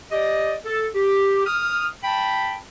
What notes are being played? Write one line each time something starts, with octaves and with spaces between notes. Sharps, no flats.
G4 D5 D#5
A4
G4
D#6 F6
G5 A5 B5